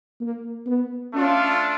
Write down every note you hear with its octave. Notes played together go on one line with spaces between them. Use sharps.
A#3
B3
A3 C#4 D4 F4